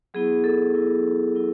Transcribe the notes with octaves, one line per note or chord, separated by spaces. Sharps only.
F#3 B3 E4 G#4
A4
F#3 B3 E4
F#3 B3 E4